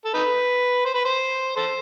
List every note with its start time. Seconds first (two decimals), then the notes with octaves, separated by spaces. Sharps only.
0.05 A4
0.14 D#4 B4
0.85 C5
0.95 B4
1.05 C5
1.56 A4 C5